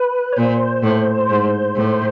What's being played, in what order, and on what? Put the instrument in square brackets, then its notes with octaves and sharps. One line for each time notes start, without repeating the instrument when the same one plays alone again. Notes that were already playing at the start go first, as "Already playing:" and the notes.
Already playing: [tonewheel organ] B4
C#5
[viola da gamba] A#2 [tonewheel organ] C5
[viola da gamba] A2
G#2
A2